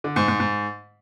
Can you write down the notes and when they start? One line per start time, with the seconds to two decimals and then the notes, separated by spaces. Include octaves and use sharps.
0.04 D3
0.16 G#2
0.28 G#2
0.40 G#2